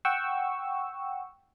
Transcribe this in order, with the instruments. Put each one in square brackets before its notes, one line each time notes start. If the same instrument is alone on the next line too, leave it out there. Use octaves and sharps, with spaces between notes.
[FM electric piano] F#5 G5 C#6 E6